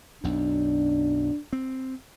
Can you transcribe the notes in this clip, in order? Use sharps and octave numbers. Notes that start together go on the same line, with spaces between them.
B1 F#2 D4
C4